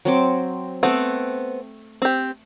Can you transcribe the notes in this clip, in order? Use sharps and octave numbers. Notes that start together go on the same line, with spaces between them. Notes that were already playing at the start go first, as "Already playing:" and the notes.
F#3 C4 D6
A3 B3 C4 G5
C4 G4